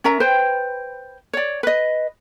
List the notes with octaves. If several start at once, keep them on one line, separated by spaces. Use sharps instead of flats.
C#4 A#4 E5 A#5
B4 C5 G5
C#5 D5
B4 D#5